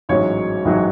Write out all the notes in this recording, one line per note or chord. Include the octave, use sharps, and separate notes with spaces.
A1 G#2 F#3 C#5
A1 G#2 F#3